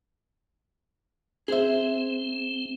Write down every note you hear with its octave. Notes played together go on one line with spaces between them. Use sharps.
C4 G#4 C5 E5